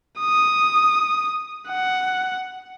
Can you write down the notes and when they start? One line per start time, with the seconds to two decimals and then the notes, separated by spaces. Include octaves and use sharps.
0.20 D#6
1.69 F#5